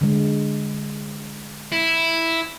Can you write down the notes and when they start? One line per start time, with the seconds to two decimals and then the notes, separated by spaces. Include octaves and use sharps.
0.01 D3 G#3
1.72 E4